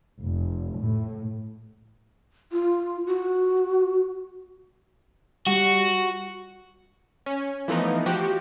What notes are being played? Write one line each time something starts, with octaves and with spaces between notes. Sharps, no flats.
F1
A2
F4
F#4
G3 F#4
C#4
E3 F3 A3 B3 D#4
F3 F#4 G4